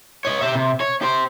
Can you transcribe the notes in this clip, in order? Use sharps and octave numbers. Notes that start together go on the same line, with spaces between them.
C#5 D#5
G4 E5
C3
C#5
G4 C5